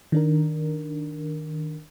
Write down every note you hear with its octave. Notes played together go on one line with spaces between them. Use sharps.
D#3 D4 A#4